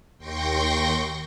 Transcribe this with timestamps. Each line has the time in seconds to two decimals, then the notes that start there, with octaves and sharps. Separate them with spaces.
0.18 D#2 G5 C6 C#6 G6 A#6